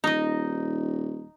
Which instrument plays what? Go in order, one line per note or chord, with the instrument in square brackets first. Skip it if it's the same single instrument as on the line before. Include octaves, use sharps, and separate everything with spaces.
[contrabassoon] D#1 [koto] D#4 D#5